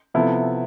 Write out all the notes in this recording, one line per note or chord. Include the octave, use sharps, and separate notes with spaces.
C3 F3 B3 E4 A4